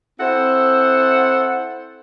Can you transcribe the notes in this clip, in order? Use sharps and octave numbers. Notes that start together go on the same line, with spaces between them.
C4 E4 A4 C5 F#5